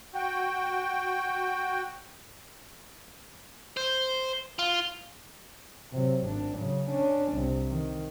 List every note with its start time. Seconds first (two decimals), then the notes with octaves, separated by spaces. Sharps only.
0.15 F#4 G5
3.77 C5
4.59 F4
5.93 C3 F#3
6.25 G#1 D4
6.59 C#3 F#3
6.90 C#4 D4
7.33 C2 C3
7.69 D#3